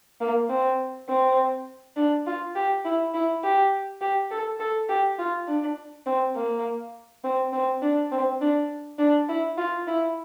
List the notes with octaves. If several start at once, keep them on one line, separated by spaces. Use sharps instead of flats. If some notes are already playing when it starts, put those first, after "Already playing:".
A#3
C4
C4
D4
F4
G4
E4
E4
G4
G4
A4
A4
G4
F4
D4
C4
A#3
C4
C4
D4
C4
D4
D4
E4
F4
E4